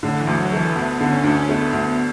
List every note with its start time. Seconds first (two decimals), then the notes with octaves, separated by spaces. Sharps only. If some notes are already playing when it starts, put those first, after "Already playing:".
0.03 A2 D3
0.20 E3
0.27 D2
0.39 F#3
0.52 E3 A3
0.76 D2 B3
1.00 D3
1.12 C#4
1.24 D2 D4
1.35 C#4
1.48 A3 B3
1.67 B3
1.73 D2
1.85 B3